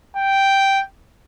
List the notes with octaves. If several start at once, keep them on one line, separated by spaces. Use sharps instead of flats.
G5